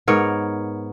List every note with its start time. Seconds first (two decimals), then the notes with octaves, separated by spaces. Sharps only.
0.08 G#2 B3 A#4 C#5